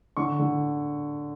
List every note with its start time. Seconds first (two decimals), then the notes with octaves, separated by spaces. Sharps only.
0.17 D3 C#6
0.39 D3